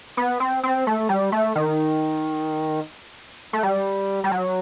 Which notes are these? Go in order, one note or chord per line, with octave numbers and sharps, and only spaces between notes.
B3
C4
C4
A3
G3
A3
D#3
A3
G3
G3
F#3